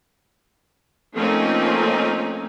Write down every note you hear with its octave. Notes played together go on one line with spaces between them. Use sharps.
F3 A3 A#3 C4 C#4 D#4